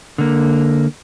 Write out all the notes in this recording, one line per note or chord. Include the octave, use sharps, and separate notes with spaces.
D3 A#3